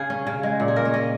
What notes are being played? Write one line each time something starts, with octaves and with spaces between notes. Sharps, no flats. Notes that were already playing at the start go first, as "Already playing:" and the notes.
Already playing: C#3 G#4
C#4
C#3
G#3
A#2
G#4
A#3 A#4
C#5
C#4 D#5